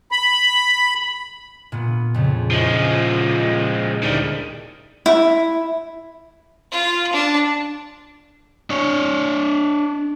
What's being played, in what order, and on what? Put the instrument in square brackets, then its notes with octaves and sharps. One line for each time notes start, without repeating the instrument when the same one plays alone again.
[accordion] B5
[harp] A#2 B3
F2 C#3
[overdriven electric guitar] F3 G#3 [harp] C#4 E4 F4
[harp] D2 E4 G#4 [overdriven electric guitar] D#3 G3
[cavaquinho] E4
[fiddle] F4
D4
[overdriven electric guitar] D4 C#5